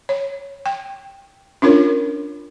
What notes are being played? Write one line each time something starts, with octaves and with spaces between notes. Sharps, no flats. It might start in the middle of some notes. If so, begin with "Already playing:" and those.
C#5
G5
C#4 D4 F4 A#4 C#5